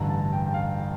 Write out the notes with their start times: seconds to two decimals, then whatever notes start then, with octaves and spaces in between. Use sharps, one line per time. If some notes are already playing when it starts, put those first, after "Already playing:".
Already playing: A1 G2 D3 A#5
0.09 A5
0.33 G5
0.47 G5
0.54 F5